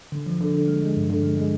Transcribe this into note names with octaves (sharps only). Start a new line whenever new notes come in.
D3
F3
D3
D3
G#3
G#3
G2
D3
G#3
G#3